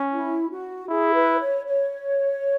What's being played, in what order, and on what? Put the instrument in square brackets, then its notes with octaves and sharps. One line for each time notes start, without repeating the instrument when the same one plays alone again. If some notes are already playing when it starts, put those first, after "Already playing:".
Already playing: [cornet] C#4
[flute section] E4
F#4
[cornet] E4 [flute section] G#4
[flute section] B4
C#5
C#5